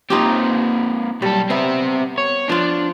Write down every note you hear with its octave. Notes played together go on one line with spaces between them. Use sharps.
A#3 C4 D#4 F4 G4
B1 G3 A4
B3 C4 E5
C#5
F3 D4 F4